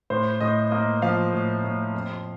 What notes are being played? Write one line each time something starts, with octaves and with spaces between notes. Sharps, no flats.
A2 C5
A2 D#5
A#3 D#5
F3 F5
A2
A2
F2